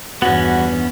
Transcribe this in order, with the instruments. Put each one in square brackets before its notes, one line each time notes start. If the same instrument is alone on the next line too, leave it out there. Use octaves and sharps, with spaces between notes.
[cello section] E2 G2 [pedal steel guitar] B3 C#4 [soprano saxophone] F#4